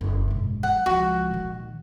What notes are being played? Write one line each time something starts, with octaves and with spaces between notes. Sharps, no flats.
F#1 D4
B1 G#2
F#3 F#5
C#2 F3 F#4
A#2 D#3